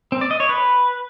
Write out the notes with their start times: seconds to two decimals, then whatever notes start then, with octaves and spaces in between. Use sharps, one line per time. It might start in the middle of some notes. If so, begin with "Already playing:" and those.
0.12 C4
0.21 D5
0.31 D#5
0.40 C#5
0.49 B4